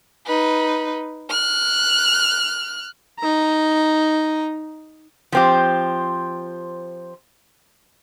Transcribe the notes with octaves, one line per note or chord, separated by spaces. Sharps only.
D#4 B4
F6 F#6
D#4 A#5
F3 C4 G4